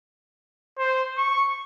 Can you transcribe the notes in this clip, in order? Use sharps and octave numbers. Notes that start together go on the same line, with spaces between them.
C5
C#6